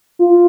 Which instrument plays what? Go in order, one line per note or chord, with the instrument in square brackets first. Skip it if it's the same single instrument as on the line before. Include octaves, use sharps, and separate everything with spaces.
[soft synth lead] F4